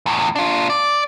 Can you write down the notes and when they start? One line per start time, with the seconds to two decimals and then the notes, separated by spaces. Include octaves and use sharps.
0.06 E2 A2
0.35 D4 F4
0.70 D5